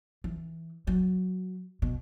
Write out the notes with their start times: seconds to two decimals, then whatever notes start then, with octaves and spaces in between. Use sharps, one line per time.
0.24 E3
0.87 F#3
1.82 B2